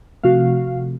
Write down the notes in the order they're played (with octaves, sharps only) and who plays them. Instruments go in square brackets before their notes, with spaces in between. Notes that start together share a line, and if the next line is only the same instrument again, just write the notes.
[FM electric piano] C3 F3 A3 [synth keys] F#4 F5